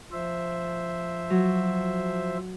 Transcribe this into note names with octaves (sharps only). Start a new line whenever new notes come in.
F3 C5 E5
F#3